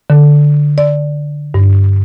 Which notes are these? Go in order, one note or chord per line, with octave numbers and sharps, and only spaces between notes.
D3
D5
G2